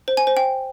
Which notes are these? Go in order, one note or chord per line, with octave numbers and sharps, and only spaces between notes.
C5
G#5
C5
G5